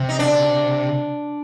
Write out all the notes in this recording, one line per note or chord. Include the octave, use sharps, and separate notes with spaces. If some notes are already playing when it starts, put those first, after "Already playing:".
Already playing: C3
D#4
D4